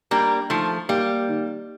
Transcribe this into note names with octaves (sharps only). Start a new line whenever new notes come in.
G3 A#3 D4
D#3 F3 A3
G3 A#3
D#3